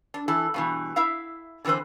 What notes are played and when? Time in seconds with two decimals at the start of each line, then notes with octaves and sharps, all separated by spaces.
0.14 D4
0.28 E3 E4 A4
0.54 G2 B2 E3
0.96 E4 E5 F5
1.65 D3 E3 C4 B4 C5